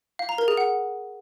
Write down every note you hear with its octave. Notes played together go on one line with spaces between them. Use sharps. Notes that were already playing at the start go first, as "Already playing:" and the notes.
F5
A#5
A#4
G#4
F#5